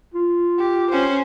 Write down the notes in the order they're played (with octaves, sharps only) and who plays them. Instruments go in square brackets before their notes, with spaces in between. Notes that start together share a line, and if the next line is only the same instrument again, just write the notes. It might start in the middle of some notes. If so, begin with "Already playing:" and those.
[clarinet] F4
[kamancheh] G4
C#4 C5